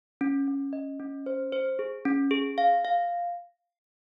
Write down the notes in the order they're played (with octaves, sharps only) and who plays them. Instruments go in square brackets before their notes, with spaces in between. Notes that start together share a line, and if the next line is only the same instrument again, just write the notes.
[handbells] C#4
C#4
D#5
C#4
C5
C5
G#4
C#4
G#4
F5
F5